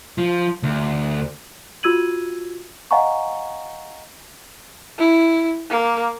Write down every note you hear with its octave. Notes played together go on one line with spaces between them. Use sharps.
F3
D2
F4 F#4 E6 G#6 D#7 F#7
D#5 F5 F#5 G#5 A#5 C#6
E4
A#3